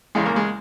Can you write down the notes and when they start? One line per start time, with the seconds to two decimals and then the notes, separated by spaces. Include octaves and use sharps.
0.15 E2 C#3 E3 G#3
0.26 A#3
0.36 G#3